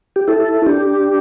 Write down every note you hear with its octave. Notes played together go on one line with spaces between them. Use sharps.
G4
E4 A4
D4 G4